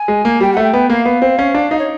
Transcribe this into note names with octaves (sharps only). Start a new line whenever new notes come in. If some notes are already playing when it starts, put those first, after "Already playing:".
Already playing: G#5
G#3
A#3
G3 G5
A3 F#5
G5
B3
A#3 F5
B3
C4
C#4
D4
D#4
C#5